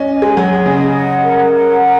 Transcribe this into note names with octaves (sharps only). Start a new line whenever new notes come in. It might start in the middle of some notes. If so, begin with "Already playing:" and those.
Already playing: C#4 D#5
G#5
G#3
F#3 G#4
C#3 D#5
F#5
A#4
F#5
A#4